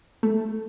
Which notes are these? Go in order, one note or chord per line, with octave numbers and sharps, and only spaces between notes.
A3